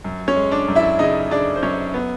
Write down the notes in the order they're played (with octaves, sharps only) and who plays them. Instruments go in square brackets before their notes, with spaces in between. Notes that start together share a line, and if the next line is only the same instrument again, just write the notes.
[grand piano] F#2
C#4 C#5
G#3
D4 D5
F#2
E4 E5
C#3 D#4 D#5
C#3 D4 D5
C5
F#2 C#4 C#5
B3